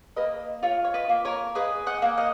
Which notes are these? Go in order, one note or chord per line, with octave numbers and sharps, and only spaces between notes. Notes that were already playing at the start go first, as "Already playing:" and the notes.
A#3 B4 D#5
F4 C#5 F5
C#5
B4 D#5
A#3
A#4 C#5
G#4 B4 D#5
D#5 F#5
A#3
D#5 F#5